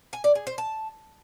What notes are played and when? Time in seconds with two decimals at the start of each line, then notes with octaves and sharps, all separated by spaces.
0.13 G#5
0.24 D5
0.35 G#4
0.47 C5
0.58 A5